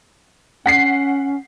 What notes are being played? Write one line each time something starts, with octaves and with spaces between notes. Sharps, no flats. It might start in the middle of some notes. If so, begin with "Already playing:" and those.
C#4 F#5 B6 C7